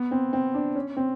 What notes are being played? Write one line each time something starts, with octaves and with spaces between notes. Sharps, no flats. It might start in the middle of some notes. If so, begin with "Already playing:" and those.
Already playing: B3
C4
C4
D4
C#4
C4